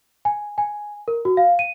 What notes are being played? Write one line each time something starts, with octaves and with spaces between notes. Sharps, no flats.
G#5
G#5
A#4
F#4
F5
D#7